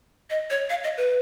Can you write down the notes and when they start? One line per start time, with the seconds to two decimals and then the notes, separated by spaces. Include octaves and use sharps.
0.30 D#5
0.50 C#5
0.70 F5
0.84 D#5
0.97 B4